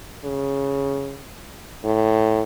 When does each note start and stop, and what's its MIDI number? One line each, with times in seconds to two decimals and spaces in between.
0.25 1.23 49
1.84 2.43 45